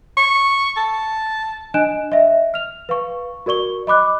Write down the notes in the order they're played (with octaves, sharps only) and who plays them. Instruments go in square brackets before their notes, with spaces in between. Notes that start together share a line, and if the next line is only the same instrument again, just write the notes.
[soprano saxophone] C#6
A5
[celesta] D4 D#5 G#5 F#6 D7 E7
D#5 E5
F6 F7
B4 F5 C#6
F#4 A#4 D5 C#6 G7
D#5 B5 D6 F#6